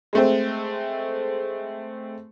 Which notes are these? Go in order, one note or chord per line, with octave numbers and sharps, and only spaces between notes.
G#3 A3 C4